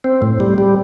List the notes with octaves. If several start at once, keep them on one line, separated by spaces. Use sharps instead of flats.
C4
A2
G3
G3